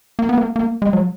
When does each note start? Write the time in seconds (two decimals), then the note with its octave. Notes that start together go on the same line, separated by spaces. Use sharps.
0.19 A#3
0.29 B3
0.38 A#3
0.56 A#3
0.82 G#3
0.93 F#3